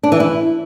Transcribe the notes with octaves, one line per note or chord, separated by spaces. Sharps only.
D4
E3
E4